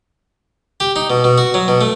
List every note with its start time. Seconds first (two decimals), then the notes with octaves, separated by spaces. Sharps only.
0.80 G4
0.96 D#4
1.10 B2
1.24 B2
1.38 F#4
1.54 F#3
1.68 B2
1.81 A3